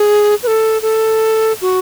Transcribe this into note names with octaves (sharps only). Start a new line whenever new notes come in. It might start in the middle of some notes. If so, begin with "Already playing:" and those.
Already playing: G#4
B4
A4
A4
F#4